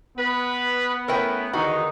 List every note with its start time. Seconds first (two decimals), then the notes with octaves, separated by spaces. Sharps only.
0.18 B3 B4
1.08 A3 C#4 E4 A#4 B4 G5
1.53 E2 D3 D#3 D#4 F#4